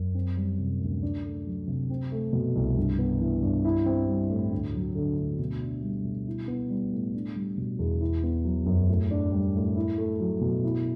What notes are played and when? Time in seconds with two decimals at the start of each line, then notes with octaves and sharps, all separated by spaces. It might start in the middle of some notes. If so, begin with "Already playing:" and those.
Already playing: F#2
0.15 C4
0.37 G3
0.59 C3
0.81 D2
1.03 D4
1.25 A3
1.47 F#3
1.68 C3
1.90 C4
2.12 A3
2.33 B2
2.55 C2
2.76 G2
2.99 B3
3.20 E3
3.42 G2
3.65 E4
3.86 C4
4.07 G3
4.29 A2
4.51 D2
4.74 F#3
4.95 D3
5.18 D2
5.39 B2
5.61 D4
5.83 G3
6.05 B2
6.27 E4
6.48 B3
6.70 G3
6.92 A2
7.14 D4
7.35 G3
7.58 B2
7.79 E2
8.01 E4
8.23 B3
8.45 F#3
8.66 F#2
8.88 A2
9.11 D4
9.32 G3
9.55 A2
9.76 E4
9.98 A3
10.20 F#3
10.41 B2
10.64 E4